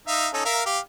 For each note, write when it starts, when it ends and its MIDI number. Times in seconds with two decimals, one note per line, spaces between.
0.08 0.28 63
0.08 0.28 76
0.08 0.28 77
0.33 0.41 61
0.33 0.41 63
0.33 0.41 69
0.45 0.61 70
0.45 0.61 76
0.45 0.61 77
0.66 0.79 67
0.66 0.79 77